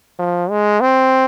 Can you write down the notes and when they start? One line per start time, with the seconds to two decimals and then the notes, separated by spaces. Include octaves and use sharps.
0.19 F3
0.50 G#3
0.81 C4